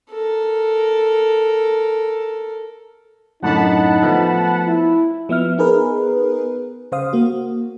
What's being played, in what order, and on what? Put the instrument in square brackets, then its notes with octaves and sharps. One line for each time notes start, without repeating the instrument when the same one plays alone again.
[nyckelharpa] A4 A#4
[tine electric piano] F#2 A2 D3 [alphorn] D#4 [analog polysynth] F#5 A5 B5
[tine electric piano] F3 A3 B3
[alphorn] E4
[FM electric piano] F3 B3 E5 F6
B3 D#4 G#4 A#4 B4
C#3 C5 F5 D#6
A#3 F#4